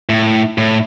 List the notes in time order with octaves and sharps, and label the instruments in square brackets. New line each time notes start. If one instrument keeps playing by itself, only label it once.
[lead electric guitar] A2
A2